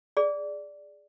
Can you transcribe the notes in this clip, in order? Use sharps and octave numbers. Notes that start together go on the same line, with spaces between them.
G#4 D5